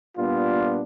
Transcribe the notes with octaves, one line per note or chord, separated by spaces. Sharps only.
A#2 G3 B3 D4 F4